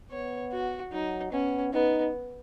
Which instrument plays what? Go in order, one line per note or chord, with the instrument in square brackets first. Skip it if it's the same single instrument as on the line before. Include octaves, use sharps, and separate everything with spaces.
[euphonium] B3 [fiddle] C#5
[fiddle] F#4
[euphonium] F#3 [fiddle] D#4
[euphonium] B3 [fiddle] C#4
[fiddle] B3 [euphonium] D#4